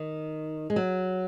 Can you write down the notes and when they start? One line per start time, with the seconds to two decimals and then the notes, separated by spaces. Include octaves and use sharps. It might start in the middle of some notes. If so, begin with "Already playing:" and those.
Already playing: D#3
0.70 G#3
0.76 F#3